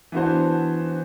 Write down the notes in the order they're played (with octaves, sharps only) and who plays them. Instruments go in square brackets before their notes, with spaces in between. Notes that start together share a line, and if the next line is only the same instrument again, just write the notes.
[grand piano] E3 B3 F#4 C5 [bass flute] D4